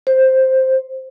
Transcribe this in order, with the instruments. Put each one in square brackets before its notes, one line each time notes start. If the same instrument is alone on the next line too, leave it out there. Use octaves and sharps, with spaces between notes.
[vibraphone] C5